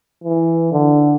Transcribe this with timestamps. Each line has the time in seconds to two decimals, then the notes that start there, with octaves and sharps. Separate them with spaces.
0.24 E3
0.72 D3